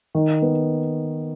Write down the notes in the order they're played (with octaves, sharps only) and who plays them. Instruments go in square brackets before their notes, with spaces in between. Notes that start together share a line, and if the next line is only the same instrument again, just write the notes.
[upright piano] D#3
B3